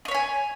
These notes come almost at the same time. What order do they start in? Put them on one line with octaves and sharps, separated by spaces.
D#5 C#5 B5 G#5